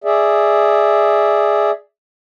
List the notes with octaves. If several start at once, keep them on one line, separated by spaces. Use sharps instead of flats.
G#4 D5 E5